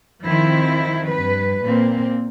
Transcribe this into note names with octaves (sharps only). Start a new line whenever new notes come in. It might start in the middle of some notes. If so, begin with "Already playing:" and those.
D#3 F3 C4 E4
G2 B4
A#2 A#3 C4